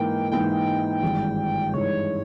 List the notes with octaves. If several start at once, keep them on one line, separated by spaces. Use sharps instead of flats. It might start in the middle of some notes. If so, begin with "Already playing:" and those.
Already playing: G#2 E3 A#3 D#4 G5
G#2 E3 A#3 D#4 G5
G#1 G2 E3 G#3 D#4
G#1 G2 E3 G#3 D#4 C#5